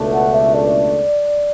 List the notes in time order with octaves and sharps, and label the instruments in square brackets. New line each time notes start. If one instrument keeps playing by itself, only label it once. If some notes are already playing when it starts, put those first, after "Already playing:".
Already playing: [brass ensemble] C#2 B2 A3 D4
[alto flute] F#5
E5
D5